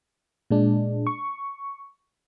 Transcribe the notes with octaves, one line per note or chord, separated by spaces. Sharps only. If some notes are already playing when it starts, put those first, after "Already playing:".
A#2 G#3 D4
C#6